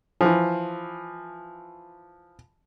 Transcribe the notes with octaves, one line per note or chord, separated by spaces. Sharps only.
E3 F3